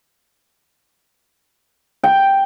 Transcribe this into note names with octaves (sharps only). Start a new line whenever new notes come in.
G5